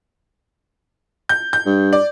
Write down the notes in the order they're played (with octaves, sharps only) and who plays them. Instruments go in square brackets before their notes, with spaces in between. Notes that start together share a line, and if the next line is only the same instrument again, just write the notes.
[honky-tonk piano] G6
G6
[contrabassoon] G2
[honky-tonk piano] D5